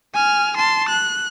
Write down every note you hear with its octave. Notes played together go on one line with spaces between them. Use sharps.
G#5 F6
A5 C6
F#6